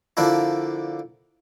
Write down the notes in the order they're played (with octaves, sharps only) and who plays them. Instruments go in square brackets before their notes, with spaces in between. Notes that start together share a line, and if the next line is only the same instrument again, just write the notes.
[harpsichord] D3 F3 A#3 D4 E4